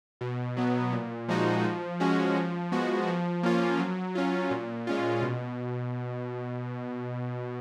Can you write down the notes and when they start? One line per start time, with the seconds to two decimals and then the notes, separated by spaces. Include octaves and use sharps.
0.21 B2
0.57 F#3 B3
0.92 A#2
1.28 F3 G#3 D#4 F#4
1.64 F3
2.00 G#3 C#4 F#4
2.36 F3
2.72 G#3 B3 F#4
3.07 F3
3.43 A#3 C#4 F4
3.79 F#3
4.15 C#4 F4
4.51 A#2
4.87 G#3 C#4 F4
5.22 B2